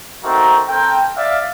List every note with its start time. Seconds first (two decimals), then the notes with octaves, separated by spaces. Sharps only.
0.23 A3 C4 D#4 F#4 A#4
0.68 C4 A4 A#4 G5
1.16 D5 E5 F5